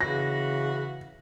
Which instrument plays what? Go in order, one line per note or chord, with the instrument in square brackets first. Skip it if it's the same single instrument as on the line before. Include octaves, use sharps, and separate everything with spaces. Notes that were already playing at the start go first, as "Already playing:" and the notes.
[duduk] C#3 [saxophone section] E3 F#4 [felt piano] A#6